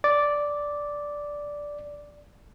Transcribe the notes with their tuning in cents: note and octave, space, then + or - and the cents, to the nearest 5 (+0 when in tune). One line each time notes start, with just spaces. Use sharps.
D5 -5